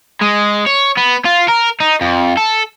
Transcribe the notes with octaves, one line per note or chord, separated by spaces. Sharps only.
G#3
C#5
B3
F4
A#4
D#4
F2
A4